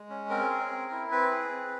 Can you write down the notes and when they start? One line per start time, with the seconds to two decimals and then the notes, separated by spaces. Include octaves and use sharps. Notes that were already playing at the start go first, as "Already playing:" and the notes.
Already playing: G#3
0.10 C#4
0.30 C4 A#4
0.50 G#4
0.71 C4
0.92 E4
1.11 C4 B4
1.31 G#4
1.51 C4